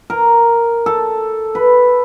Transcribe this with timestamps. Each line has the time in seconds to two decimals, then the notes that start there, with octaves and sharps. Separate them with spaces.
0.10 A#4
0.86 A4
1.55 B4